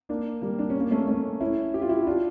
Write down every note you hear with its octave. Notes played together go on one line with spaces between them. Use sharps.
A#3 D4
G3 A#3
D4
C#4
A#3
A3 C#4
A3 C#4
C#4 E4
G4
F4
E4 G4
E4
D4 F4